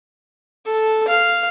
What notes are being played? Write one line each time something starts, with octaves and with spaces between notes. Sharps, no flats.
A4
F5